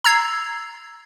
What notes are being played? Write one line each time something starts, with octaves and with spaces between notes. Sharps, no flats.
A#5 E6 G#6 C7